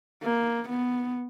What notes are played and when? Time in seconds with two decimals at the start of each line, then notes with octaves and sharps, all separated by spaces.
0.23 A#3
0.69 B3